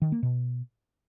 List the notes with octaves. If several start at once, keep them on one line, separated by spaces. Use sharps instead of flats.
D#3
A#3
B2